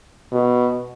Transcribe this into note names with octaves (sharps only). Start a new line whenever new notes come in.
B2